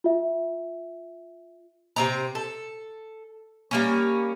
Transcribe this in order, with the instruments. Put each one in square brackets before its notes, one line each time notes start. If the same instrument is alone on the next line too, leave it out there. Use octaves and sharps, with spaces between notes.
[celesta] F4 E5
[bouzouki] C3 C4 A#5
A4
G3 A#3 C#4